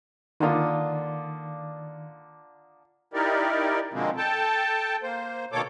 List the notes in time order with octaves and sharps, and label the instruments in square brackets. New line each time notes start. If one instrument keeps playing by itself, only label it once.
[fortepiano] D3 A#3 F4 [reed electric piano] D#3 [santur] D5 A5 D#6
[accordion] D#4 E4 G4 A#4 D5
B2 D3 F3 G#3 A#3 C4
A4 G5 A5
A#3 C5
B2 D#3 A#3 A4 C#5 D6